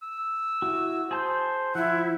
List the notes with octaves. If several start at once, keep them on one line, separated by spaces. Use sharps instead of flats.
E6
E4 F#4
G#4 C5 A5 G6
F3 E4 E5 F#5